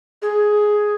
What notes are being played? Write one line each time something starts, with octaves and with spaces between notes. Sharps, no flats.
G#4